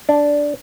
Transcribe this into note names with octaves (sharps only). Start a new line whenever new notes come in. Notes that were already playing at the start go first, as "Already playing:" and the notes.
D4